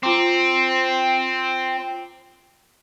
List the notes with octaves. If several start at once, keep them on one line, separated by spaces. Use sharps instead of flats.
C4 F4 A#5 D6